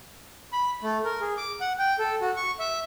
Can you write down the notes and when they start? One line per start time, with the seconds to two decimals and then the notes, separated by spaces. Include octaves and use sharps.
0.53 B5
0.82 A3
1.05 A#4
1.21 G#4
1.37 D6
1.61 F#5
1.79 G5
1.99 A4
2.21 F#4
2.36 C#6
2.59 E5